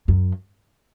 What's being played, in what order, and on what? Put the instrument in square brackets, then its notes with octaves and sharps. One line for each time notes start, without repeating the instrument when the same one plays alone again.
[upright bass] F#2